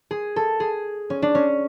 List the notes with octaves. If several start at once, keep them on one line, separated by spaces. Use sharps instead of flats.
G#4
A4
G#4
C#4
D4
C#4